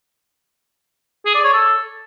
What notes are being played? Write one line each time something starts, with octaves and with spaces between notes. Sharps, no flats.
G#4
D5
C#5
A4